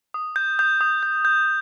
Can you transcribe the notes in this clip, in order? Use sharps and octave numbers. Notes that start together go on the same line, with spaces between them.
D#6
G6
D#6 G6
D#6
G6
G6